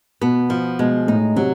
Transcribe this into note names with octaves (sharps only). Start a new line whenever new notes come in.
B2 B3
F3
B2 G#3
A2 D#4
C3 F#3